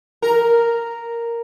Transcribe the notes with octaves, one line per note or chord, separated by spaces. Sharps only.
A#4